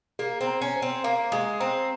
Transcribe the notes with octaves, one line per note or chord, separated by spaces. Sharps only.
A#3 G#4
C4
A#5
C#4
C5
C4
A#3 F5
G#3 G#4
C4 A#5